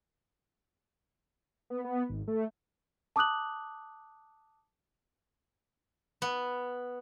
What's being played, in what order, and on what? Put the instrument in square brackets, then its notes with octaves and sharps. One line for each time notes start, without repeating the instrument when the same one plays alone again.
[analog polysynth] B3
B3
G#1
A3
[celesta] A5 D6 D#6 F#6 F#7
[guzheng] B3